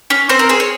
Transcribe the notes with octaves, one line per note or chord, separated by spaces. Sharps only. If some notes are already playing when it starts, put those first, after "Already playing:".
C#4
C4 C5
A#4
G#4 C5
C#5